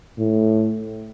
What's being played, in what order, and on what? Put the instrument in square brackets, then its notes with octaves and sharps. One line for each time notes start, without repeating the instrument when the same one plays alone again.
[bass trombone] A2